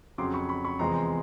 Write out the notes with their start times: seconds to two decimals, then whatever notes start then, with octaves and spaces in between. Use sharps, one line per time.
0.18 F2 C#3 F#3 C6 D6
0.34 B5 C#6
0.49 B5 C#6
0.65 B5 C#6
0.79 E2 C3 F3 G#3 A#5 C6